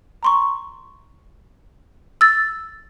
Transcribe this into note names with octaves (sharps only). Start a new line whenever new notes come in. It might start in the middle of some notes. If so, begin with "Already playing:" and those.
A#5 C6 C#6
E6 A6